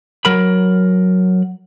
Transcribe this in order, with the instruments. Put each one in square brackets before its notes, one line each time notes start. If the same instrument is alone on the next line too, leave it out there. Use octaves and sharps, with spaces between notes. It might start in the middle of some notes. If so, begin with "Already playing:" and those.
[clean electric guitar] F#3 A#4 B5